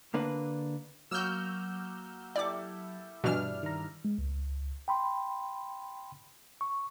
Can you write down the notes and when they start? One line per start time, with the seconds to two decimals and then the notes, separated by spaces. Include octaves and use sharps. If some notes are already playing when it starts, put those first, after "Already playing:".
0.14 D3 A#3 D4 B4
1.11 F#3 A#3 F#4 E6 F6 G6
2.36 E4 G4 A4 D5 D6
3.24 G2 B2 E3 D4 F6
3.63 D#3 A#5
4.05 G#3
4.18 C#2
4.88 G5 B5 C6
6.61 C#6